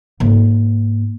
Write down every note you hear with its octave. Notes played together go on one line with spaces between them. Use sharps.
G#2 A#3